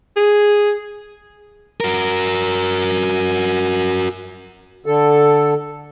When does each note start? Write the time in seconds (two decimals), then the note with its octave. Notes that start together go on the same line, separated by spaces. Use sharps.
0.16 G#4
1.81 F#4 A#4
4.86 D3 A4